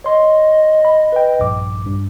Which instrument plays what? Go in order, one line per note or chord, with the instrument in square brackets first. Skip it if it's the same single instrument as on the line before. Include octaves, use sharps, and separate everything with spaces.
[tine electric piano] C#5 C6 [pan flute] D#5
[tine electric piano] B5
B4 G5
A#1 G2 D6
G2